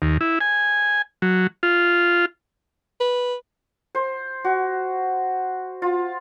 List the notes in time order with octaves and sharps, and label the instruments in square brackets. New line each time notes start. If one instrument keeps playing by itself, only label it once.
[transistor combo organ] D#2
E4
G#5
F#3
F4
[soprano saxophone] B4
[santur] C5
F#4
F4